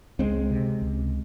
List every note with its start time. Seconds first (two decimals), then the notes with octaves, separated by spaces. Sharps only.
0.19 C#2 G#3 C4
0.50 C3
0.82 C#2